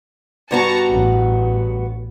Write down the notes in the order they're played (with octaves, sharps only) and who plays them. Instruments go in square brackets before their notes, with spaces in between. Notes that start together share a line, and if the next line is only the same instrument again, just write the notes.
[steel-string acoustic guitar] G2 B3 F#4 [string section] A5 A#5 C#6
[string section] A1